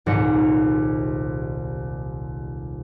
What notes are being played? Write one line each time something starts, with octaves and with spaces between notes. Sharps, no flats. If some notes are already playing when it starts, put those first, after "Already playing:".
D#1 C2 G#2 A#6 C#7